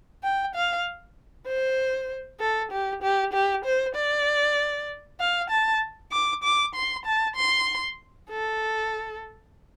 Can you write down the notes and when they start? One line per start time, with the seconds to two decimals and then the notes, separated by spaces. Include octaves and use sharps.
0.23 G5
0.55 F5
1.47 C5
2.40 A4
2.72 G4
3.02 G4
3.33 G4
3.65 C5
3.95 D5
5.20 F5
5.50 A5
6.12 D6
6.43 D6
6.75 C6
7.05 A5
7.36 C6
8.30 A4